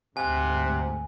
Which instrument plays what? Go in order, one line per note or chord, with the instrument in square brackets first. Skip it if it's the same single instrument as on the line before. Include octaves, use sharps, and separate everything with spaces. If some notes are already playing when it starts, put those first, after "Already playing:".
[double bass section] D2 G#2 [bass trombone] C3 [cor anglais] F#5 [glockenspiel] G#5